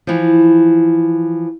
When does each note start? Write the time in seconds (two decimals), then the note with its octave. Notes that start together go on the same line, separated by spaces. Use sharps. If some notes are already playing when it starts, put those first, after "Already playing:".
0.07 E3 F3